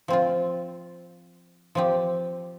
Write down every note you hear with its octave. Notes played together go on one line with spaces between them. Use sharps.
F3 C4 F4
F3 C4 G4